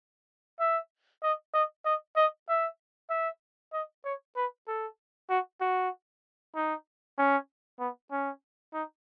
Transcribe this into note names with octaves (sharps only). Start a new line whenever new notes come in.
E5
D#5
D#5
D#5
D#5
E5
E5
D#5
C#5
B4
A4
F#4
F#4
D#4
C#4
B3
C#4
D#4